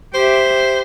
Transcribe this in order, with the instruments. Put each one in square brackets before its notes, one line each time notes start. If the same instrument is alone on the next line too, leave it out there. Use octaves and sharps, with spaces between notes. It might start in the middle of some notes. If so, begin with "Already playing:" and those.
[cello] G4 E5 [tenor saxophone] C5